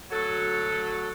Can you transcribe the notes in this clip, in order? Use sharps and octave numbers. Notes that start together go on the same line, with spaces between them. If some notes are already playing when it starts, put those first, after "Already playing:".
D2 F#3 F#4 A4